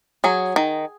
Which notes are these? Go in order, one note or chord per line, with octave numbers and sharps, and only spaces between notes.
F#3 G#4
D#3